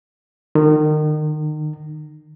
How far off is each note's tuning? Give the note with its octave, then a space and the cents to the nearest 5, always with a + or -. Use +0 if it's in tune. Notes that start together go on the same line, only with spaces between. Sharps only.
D#3 -30